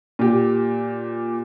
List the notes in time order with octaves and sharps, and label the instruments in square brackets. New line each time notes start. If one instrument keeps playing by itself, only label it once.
[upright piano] A#2 G4